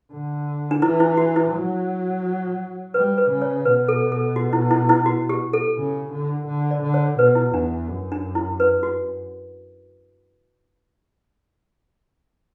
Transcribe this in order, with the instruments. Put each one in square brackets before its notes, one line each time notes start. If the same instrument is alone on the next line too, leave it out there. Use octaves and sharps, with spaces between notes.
[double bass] D3
[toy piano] D4
[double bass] E3 [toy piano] E4
[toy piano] E4
F#4
E4
[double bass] F#3
[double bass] G3 [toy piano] B4
[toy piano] B4
[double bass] C#3
[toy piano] C#5
[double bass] B2 [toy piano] B4
[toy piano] A4
A4
F#4
E4
E4
E4
F#4
G4
A4
[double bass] C#3
D3
D3
[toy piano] D5
[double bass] D3
[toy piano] C#5
[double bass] B2 [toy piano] B4
[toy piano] E4
[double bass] E2 [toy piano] D4
[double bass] F#2
[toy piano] D4
E4
B4
F#4